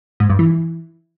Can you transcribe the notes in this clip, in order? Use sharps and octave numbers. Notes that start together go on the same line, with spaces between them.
G#2
G2
E3